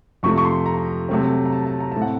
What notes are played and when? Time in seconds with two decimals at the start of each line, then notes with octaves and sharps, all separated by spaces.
0.23 F2 C3 F3 A3 C#6
0.38 C#6
0.45 C6
0.66 A#5
1.09 C3 F#3 A3 C4
1.46 A#5
1.52 A5
1.67 A5
1.80 A#5
1.92 A2 A3 C4 A5
2.02 F#5